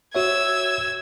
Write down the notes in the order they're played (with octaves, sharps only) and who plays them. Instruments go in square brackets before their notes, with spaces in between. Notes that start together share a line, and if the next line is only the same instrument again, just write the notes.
[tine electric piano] F#4 C#5 E5 [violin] E6 G#6